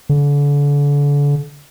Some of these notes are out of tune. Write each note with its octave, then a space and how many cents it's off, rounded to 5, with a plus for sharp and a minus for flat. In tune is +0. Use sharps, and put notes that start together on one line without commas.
D3 -35